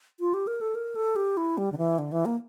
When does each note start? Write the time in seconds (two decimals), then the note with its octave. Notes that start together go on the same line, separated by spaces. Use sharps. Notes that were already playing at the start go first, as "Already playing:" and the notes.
0.20 F4
0.34 G4
0.47 A#4
0.61 A4
0.75 A#4
0.95 A4
1.16 G4
1.37 E4
1.58 G3
1.72 D3
1.78 E3
1.98 D3
2.12 E3
2.25 A#3